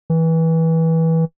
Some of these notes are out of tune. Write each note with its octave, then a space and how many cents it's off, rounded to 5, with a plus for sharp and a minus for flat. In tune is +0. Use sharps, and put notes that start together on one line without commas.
E3 -20